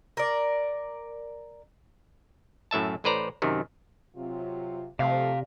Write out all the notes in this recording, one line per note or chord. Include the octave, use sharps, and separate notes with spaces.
A#4 D5
F#2 A2 E5 A5
A1 A2 B4 C5 D5 A#5
F#2 C3 D#3
C3 F#3 F4
C3 F3 A3 D5 F5